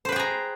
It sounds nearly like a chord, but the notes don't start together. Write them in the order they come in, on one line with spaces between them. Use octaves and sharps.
C5 B4 G5 G#4 A#5